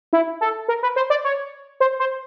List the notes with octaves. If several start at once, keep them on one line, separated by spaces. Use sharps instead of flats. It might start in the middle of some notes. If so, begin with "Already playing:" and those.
E4
A4
A#4
B4
C5
D5
C#5
C5
C5